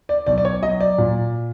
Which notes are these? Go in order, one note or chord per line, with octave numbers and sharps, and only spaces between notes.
D5
B1 D5
D5
C#5
F#3 D#5
D5
A#2